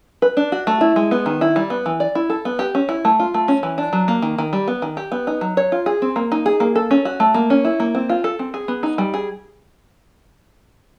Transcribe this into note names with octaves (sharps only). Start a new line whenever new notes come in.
B4
D4
F#4
A3
E4
G#3
B3
D#3
E4
G3
B3
E3
D5
E4
A4
B3
G4
C#4
E4
A3
F4
A3
C#4
E3
D4
F#3
A#3
D#3
D#3
G3
B3
D#3
G4
B3
D#4
F#3
C#5
F4
G#4
C4
A#3
D#4
G#4
A#3
A4
C#4
F#4
A3
A#3
C#4
E4
A#3
C4
F4
A4
C4
G#4
B3
D#4
G3
G#4